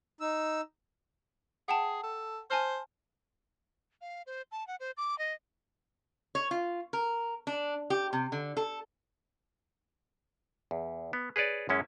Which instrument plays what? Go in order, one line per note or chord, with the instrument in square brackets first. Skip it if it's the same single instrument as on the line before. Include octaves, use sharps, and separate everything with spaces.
[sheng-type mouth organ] D#4 E6
[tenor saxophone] G#4 [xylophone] F#5 G5 A5
[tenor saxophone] A4
[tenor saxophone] C5 [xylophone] G#5 A5 F6
[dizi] F5
C5
A5
F#5
C5
D6
D#5
[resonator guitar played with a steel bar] C#5
F4
A#4
D4
G4
C3
D3
A4
[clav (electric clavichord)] E2
B3
G#4 B4 C#5 D5
F#2 G#3 C#4 E4